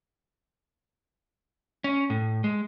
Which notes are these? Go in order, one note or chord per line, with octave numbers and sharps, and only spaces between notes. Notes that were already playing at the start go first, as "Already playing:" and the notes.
C#4
A2
G#3